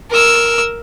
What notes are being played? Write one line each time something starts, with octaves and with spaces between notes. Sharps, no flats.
A#4 E6